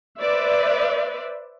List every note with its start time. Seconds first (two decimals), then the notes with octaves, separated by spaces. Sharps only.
0.18 B4 C5 D5 E5